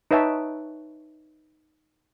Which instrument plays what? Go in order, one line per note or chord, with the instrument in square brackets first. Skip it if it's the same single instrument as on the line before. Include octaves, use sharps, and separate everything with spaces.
[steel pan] D#4 B4 C#5 E5 G5 A5